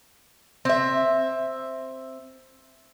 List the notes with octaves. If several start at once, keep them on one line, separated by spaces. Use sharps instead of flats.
C4 E5